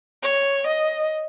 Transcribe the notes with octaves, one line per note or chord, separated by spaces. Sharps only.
C#5
D#5